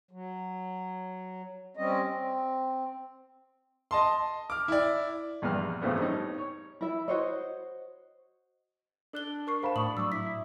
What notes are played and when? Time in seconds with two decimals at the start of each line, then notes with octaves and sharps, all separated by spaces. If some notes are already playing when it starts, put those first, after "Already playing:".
0.11 F#3
1.77 G3 C4 C#4 D#5
2.07 C4
3.91 D#5 A5 C6
4.50 D6 F6
4.68 E4 D5
5.42 A#1 E2 G2 B4 F6
5.82 E2 A2 C#3 F3 A3 B3
5.99 G3 C4 C#4 D#4
6.38 C#5
6.81 E4 E5
7.08 F#4 C5 C#5 D#5
9.13 D4 A4 F#6 G7
9.47 A#4 C#6 C7
9.63 C5 F5 A5 B5 C7
9.76 A2 B5 C#6 D#6 F#7
9.97 F#3 C#6 D6 E6
10.12 E4 B6